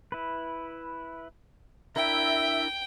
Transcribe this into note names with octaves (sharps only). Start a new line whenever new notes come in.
E4 B4
D4 E4 A#4 E5 G5